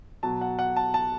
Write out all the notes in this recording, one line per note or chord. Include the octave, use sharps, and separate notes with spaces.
B2 F#3 A5
F#5
F#5
A5
A5